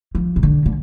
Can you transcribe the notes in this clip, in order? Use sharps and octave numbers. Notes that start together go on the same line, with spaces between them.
F3
C3
D3
D3